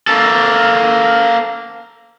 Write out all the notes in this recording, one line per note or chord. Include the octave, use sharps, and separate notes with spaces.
A#3 A4